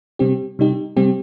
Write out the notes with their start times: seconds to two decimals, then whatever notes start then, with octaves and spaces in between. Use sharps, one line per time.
0.19 C3 G3 C4 G4
0.59 C3 G3 D#4 G4
0.97 C3 G3 C4 G4